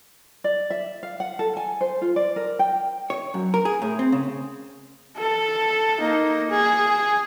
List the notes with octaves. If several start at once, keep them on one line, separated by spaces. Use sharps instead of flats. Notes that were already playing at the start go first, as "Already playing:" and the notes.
D5
E5
F5
F#5
A4
G#5
C5
F4
D5
A#4
G5
C#5
F#2
A#4
G#4
A2
C4
C#3
A4
A#3 D#4
G#4